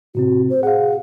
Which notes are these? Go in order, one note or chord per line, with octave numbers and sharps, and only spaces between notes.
A2 C3 C4 F#4
C5
G#4 F5 F#5